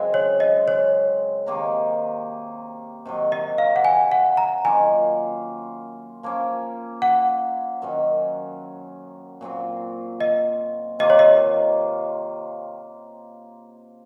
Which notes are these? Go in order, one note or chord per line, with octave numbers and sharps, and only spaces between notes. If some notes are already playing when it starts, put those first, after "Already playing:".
Already playing: F#2 C#3 G#3 C4
C#5
D#5
C#5
C3 D#3 A#3 D#4
C3 D#3 F#3
D#5
F5
F#5
G#5
F#5
A#5
F#2 D#3 A#3 F4 G#5
F3 A#3 C#4
F#5
F#2 D#3 F#3 C#4
A#2 F#3 C4 F4
D#5
C3 D#3 A#3 F4 D#5
C#5
D#5